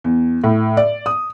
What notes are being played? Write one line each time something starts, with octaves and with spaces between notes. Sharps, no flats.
E2
A2
D5
D#6